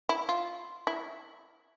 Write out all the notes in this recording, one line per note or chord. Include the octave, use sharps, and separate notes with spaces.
E4
F4
E4